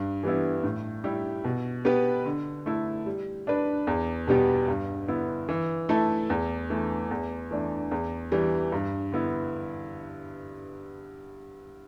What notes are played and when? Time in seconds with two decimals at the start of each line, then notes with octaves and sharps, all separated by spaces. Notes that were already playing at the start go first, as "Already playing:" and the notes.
Already playing: G2
0.23 E3 G3 B3 E4
0.64 A2
1.04 G3 E4 G4
1.44 B2
1.85 B3 G4 B4
2.26 D3
2.66 A3 E4 A4
3.06 G3
3.47 D4 B4
3.87 E2
4.28 B2 G3 B3 G4
4.68 G2
5.08 D3 B3 E4
5.49 E3
5.89 A3 E4 A4
6.30 E2
6.70 E3 A3
7.11 E2
7.51 E3 A3 D4
7.91 E2
8.32 E3 G3
8.72 G2
9.12 D3 B3 E4